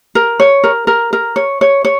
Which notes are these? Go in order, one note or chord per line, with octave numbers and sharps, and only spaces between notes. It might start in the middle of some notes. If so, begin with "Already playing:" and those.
A#4
C#5
A#4
A#4
A#4
C#5
C#5
C#5